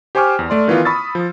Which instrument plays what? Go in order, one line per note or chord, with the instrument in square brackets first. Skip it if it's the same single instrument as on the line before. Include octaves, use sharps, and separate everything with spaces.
[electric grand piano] G4 C5 G#5 C#6 D6 F6
E2
A3 D5 C6
D#3 E3 B3 F4
B5 C#6 D#6 E6 A6
F3